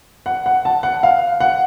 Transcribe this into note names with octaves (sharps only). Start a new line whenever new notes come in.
F#5
F#5
A5
F#5
F5
F#5